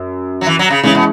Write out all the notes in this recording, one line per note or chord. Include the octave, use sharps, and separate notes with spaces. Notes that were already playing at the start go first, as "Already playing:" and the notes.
Already playing: F#2
F#3
E3
F#3
C#3
C#3 E3 G#3 C#4 E4
B2